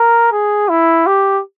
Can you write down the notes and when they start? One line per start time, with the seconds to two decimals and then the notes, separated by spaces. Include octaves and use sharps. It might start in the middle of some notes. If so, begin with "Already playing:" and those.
Already playing: A#4
0.32 G#4
0.69 E4
1.07 G4